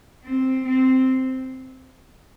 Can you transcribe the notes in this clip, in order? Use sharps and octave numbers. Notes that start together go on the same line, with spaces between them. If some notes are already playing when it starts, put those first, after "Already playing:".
C4
C4